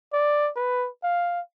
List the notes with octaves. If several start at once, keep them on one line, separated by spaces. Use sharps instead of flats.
D5
B4
F5